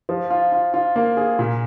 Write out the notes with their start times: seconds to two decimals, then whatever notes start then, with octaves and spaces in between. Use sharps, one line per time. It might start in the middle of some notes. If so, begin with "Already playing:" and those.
0.09 F3
0.30 F4
0.52 F4
0.74 F4
0.96 A#3
1.17 G#4
1.39 A#2